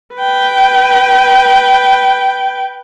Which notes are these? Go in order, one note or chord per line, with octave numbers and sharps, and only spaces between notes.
B4 G5